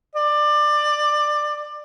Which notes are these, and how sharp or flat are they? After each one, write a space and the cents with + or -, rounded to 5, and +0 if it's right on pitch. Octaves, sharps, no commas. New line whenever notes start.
D5 +20